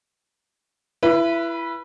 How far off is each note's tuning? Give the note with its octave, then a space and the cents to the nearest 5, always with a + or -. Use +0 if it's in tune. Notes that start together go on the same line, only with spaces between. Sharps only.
E4 +25 B4 -15